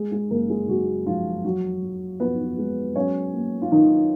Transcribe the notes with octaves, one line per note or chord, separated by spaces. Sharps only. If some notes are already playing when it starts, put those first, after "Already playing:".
Already playing: G#3 G#4
G#3 G#4
F#1 A#3 A#4
G#3 G#4
F#1 F#3 F#4
F3 G#3 F4
F2 F#3 F#4
F2
F2 B3 B4
G#3
F#3 C#4 C#5
A#3
F4
D#3 F#3 D#4